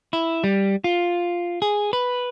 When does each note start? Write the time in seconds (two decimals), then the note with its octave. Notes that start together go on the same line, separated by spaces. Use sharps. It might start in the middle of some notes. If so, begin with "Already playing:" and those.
0.13 E4
0.44 G3
0.84 F4
1.62 G#4
1.93 B4